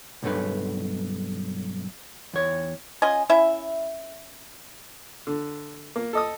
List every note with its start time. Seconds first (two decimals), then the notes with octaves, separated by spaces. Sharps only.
0.22 B1 G2 A3 B4
2.33 E2 C#5
3.02 C#4 F4 D#5 G#5
3.30 C#4 E4 E5
5.27 D3
5.96 A#3
6.13 A4 D#5 D#6